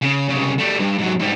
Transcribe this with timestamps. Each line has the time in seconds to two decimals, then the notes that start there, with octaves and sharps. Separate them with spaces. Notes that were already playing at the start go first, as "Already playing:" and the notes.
0.02 C#3
0.29 C2 C#3
0.58 G3 A3
0.79 G2
0.98 G#2 F#3
1.19 G#2 G3